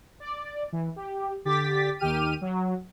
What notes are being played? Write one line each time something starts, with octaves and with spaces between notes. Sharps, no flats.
D5
E3
G4
D3 G4 D6 A6 B6
D#2 D#3 G4 F6 D#7
F#3